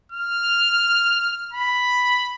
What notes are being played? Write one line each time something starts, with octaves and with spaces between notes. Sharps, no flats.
F6
B5